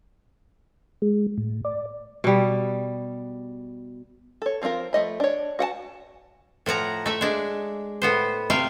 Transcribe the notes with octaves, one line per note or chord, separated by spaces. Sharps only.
G#3
A2
D5
B2 G3
A4 C#5
F3 C4 D#4 F4 A#4
F3 A3 D#5 B5
D4 C#5
F#4 F#5 G5 A5
A2 F3 F#5 A#5
A3 E5
G#3 D4
A2 B3 C5
C3 A3 F5 G5